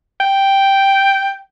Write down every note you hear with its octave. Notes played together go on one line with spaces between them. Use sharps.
G5